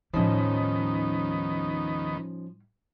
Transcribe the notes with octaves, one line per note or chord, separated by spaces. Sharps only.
D#2 A2 D#3 F3 G3 B3 C#4 D#4